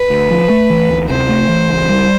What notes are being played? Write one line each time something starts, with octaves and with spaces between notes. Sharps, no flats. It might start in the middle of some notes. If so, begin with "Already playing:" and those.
Already playing: B4
D2
F3
A3
E3
D2
C3 C5
A3
E3
C#2
G3